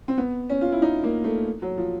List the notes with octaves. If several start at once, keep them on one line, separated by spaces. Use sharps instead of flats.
C4
B3
C#4
F4
E4
D#4
A#3
A3
F#3
F3